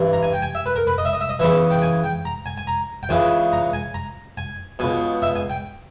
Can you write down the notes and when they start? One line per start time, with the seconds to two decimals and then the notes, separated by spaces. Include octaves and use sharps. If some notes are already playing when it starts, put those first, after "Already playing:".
Already playing: G2 E3
0.13 A#5
0.23 G#5
0.33 G5
0.42 G#5
0.55 E5
0.66 B4
0.76 A#4
0.87 B4
0.98 D#5
1.05 E5
1.13 D#5
1.21 E5
1.29 D#5
1.39 E2 C#3 E3 E5
1.71 G5
1.82 G#5
2.04 G5
2.25 A#5
2.46 G#5
2.58 G#5
2.67 A#5
3.03 G5
3.09 C#2 C#3 E3 G#5
3.53 A#5
3.73 G#5
3.94 A#5
4.37 G#5
4.79 C#2 B2 G#5
5.22 E5
5.35 G#5
5.50 G5